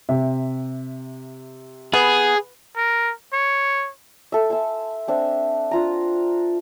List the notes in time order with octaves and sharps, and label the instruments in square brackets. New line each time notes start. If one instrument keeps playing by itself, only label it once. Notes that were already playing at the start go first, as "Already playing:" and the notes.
[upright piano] C3 E5
[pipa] B3 [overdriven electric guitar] G#4
[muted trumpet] A#4
C#5
[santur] A4 E5
E5 G#5 A5 C6
C4 D4 E5
D4 F4 A#5